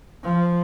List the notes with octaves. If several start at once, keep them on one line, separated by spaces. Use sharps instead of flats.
F3